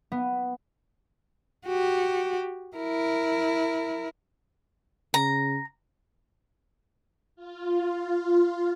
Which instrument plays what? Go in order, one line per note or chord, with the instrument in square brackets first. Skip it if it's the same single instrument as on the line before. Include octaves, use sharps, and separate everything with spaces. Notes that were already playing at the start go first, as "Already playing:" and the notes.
[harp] B3
[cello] F#4 G4
E4 A#4
[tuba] C#3 [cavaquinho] A#5
[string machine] F4